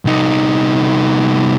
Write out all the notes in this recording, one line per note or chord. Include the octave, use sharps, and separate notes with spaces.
C2 D#4